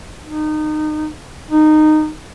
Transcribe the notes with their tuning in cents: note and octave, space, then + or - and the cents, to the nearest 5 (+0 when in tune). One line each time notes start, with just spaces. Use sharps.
D#4 -25
D#4 -15